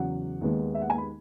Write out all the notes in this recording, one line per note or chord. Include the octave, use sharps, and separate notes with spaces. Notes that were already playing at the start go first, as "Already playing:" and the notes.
Already playing: E2 C#3 F#3 F#5
D#2 D#3 G#3 B3
E5
F#5
G#5
B5